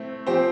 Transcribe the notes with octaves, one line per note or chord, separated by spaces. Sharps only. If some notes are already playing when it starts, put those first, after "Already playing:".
Already playing: A3 C4 E4
F3 C4 G4 C5